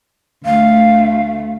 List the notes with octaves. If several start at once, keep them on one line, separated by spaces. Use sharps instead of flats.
D2 A3 F5